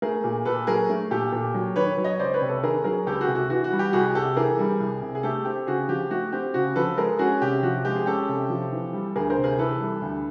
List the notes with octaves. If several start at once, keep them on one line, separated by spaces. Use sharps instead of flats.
A3 G#4 A#4
A#2
A#2 A4 B4
F#3 G#4 A#4
A3
A#2 G4 A4
A#2
F#3
D#3 B4 C#5
F#3
C#5 D#5
C#2 C5 D5
B4 C#5
C3
A4 B4
D#3 G#4 A#4
F#3 G#4 A#4
C#2 G4 A4
F#4 G#4
C3
F#4
E3 F#4
F#4
G3
G4
C2 F#4 G#4
C3 G4 A4
E3 G#4 A#4
G3
C2
C3
G#4
A3 G4 A4
C4 G4
C#3 F#4 G#4
F3 G4
A3 F#4
C4 G4
C#3 F#4
F3 A4 B4
G#3 G#4 A#4
C#4 F#4 G#4
C3 G4
F3 F#4
G#3 G4
G#4
C#4 G4 A4
C3
F3
E3
G3
D2 G#4 A#4
A#4 C5
C3
G#4 A#4
E3 A4 B4
G3
D2